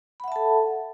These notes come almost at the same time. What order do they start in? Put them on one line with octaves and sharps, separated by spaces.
B5 F#5 E5 A5 A4